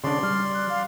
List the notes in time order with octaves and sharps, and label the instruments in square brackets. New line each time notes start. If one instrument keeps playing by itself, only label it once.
[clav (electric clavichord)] C#3 D4 [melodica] D5 C6
[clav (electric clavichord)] G3 [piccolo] F6
[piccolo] F#6
F5